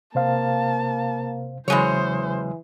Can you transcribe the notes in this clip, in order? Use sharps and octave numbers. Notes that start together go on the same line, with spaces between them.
C3 A#3 C5 F5 A5
E2 C#3 E3 F#3 G#3 C5 C#5